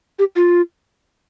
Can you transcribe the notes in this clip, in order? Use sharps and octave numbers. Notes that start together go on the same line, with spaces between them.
G4
F4